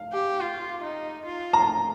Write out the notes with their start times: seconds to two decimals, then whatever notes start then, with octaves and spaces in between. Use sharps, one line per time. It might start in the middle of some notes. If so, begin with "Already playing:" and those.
Already playing: F5
0.13 G4
0.41 F4
0.83 D#4
1.26 F4
1.53 A#5